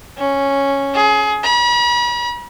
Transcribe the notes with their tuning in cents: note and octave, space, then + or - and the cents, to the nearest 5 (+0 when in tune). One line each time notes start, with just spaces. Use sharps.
C#4 -5
G#4 +25
B5 -40